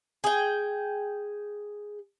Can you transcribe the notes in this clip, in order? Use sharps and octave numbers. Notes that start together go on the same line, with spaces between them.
G#4 G5